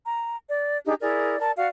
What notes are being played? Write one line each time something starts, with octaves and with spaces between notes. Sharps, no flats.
A#5
D5
D4 D#4 G4 G#4
E4 G#4 A#4 D5
A#4 D5 A5
F#4 D5 F5